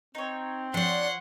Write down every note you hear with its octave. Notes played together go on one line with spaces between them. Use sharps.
C4 D#4 C#5
F3 D4 C#5 D5 F#5 C6